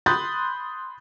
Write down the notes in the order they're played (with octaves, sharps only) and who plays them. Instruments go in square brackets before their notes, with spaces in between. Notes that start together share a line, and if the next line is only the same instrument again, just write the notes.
[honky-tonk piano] B5 C6 D#6 F#6 G6 A6